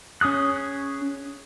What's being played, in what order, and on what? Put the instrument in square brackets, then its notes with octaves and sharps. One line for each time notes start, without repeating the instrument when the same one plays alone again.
[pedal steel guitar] C#4 G#4 D#6 F#6